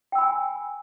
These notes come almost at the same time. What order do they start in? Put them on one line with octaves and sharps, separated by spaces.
G5 E6 B5 G#5